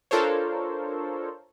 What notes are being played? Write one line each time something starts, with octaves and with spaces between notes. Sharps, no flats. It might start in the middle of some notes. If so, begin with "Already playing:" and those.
D4 F4 A4 A#4 C5 C#5